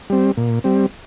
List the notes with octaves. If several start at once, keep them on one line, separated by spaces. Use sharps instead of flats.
G3 C4
A#2
G3 C4